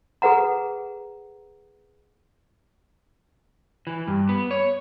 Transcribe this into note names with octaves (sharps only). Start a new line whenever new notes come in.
G#4 A4 B4 F#5 A#5
E3
G2
B3
C#5